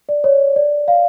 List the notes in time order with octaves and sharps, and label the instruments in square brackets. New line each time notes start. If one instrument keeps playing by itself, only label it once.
[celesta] D5
C#5
D5
F5